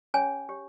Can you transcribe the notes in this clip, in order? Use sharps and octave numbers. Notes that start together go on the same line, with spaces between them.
C#4 G#4 C#5 G#5
G4 C#5